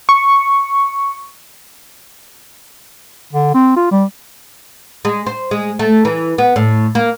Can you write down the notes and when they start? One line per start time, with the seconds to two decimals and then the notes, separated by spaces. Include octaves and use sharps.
0.09 C#6
3.33 D3
3.54 C4
3.76 F4
3.92 G3
5.05 G#3
5.27 C5
5.51 G#3
5.79 A3
6.05 E3
6.38 B3
6.56 A2
6.95 A#3